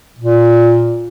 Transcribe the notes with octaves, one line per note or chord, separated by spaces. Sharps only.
A#2